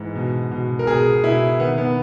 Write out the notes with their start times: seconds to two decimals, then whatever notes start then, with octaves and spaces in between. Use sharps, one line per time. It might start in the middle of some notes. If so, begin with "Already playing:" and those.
Already playing: G#2 E3
0.15 B2
0.51 B2
0.79 A#4
0.87 B2 G#4
1.24 B2 E4
1.60 D#3 B3
1.78 B3